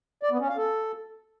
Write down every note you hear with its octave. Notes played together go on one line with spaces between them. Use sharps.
D5
B3
C#4
F5
A4